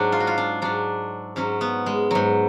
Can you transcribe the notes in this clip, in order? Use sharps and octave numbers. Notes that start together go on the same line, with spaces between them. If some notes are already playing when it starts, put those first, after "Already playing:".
Already playing: G#2 F#3 D4
F4
F#4
F4
D4
G#2 F#3 D4
G#2 F#3 C#4
B3
G#3
G#2 F#3